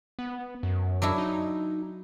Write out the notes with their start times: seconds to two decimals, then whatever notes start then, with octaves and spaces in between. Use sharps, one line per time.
0.19 B3
0.63 F#2
1.02 F#3 D4 E4
1.18 D#4